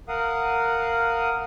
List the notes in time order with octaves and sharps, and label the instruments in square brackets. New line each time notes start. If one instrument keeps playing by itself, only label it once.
[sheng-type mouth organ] A#4 F5 F#5 D#6